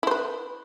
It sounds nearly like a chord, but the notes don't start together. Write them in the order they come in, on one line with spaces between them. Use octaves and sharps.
E4 C5 B4